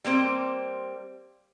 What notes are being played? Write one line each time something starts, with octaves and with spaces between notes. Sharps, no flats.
G3 A#3 C4 C5